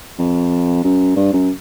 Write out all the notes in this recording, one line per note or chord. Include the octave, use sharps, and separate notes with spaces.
F2
F#2
G2
F#2